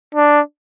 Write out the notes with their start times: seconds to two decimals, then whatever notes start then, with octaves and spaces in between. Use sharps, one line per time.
0.15 D4